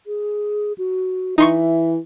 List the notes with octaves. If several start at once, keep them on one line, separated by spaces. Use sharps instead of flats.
G#4
F#4
E3 D#4 E5 C6 C#6